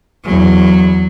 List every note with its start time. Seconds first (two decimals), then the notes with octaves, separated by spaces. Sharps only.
0.25 E2 F#3